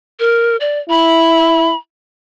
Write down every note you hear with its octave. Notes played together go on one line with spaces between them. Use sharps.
A#4
D5
E4 B5